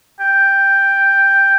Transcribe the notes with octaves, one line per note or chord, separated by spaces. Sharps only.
G5